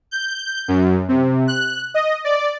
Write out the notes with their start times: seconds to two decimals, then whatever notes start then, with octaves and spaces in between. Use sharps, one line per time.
0.11 G6
0.68 F#2
1.09 C3
1.48 F#6
1.94 D#5
2.25 D5